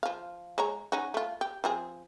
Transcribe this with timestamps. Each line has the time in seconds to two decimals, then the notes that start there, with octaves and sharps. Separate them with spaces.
0.03 F3 F5
0.58 G#3 C#5 A#5
0.92 C#4 D#4 F#4
1.14 A3 F4
1.41 G4
1.64 F3 C4 G#4